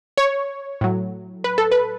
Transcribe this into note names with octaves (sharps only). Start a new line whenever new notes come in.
C#5
A2 F#3
B4
A4
B4